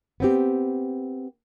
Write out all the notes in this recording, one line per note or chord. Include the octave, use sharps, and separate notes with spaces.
B3 C4 G4